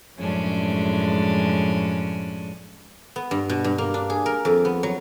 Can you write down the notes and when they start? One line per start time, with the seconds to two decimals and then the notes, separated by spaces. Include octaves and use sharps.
0.18 F#2 A2 F3 G#3 C#4 D4
3.16 B3
3.31 G2
3.49 B2
3.64 G2
3.78 A#3
3.94 D4
4.10 G#4
4.26 A#4
4.45 F2
4.65 B3
4.83 F#3